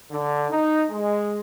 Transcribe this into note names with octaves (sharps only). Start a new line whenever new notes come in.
D3
D#4
G#3